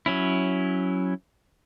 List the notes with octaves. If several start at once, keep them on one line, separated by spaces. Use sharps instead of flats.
F#3 C#4 E4